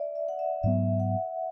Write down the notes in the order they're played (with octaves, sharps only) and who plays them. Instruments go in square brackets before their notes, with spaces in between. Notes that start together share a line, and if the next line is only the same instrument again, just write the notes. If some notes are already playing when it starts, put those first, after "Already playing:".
Already playing: [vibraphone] D5 E5
E5
F#5
E5
[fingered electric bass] G#2 F#3 B3 [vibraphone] E5
[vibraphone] F#5